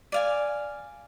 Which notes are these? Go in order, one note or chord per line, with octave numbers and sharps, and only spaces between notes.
D5 F5 G#5